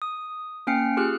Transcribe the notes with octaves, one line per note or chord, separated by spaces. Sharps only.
D#6
A#3 C#4 G5 F6 C7 C#7
F4 G4 G#4 F6 F#6